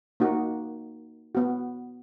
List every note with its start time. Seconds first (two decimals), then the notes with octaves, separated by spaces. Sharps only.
0.20 A#3 D#4 F#4
1.35 B3 F#4